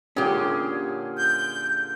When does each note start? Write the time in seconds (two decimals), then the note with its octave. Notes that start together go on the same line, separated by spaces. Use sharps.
0.16 A#2 D3 C#4 G4 G#4
1.18 G6